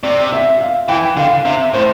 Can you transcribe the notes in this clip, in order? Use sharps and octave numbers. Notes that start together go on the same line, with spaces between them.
C3 D5
E5
F5
E3 G5
D3 F5
C3 E5
A2 C5